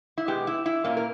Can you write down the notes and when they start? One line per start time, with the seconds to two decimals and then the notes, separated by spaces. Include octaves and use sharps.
0.18 E4
0.28 B2 G#3 B3 G4
0.47 E4
0.66 E4
0.84 A#2 A#3 C#4
0.97 A#4